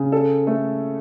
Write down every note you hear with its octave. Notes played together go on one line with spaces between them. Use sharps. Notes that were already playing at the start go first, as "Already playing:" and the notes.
Already playing: C#3
A4
A3